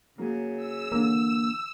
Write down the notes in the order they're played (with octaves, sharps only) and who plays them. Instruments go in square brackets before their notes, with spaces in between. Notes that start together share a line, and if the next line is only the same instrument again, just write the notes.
[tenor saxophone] C#3 [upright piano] F#3 A#3
[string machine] E6
[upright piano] D3 E3 [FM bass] A#3